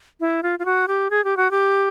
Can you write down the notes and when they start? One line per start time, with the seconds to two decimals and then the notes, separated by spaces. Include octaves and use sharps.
0.20 E4
0.43 F4
0.59 F4
0.65 F#4
0.88 G4
1.10 G#4
1.24 G4
1.37 F#4
1.51 G4